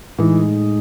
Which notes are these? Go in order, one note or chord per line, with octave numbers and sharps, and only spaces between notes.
A2 E3 G#3 D#4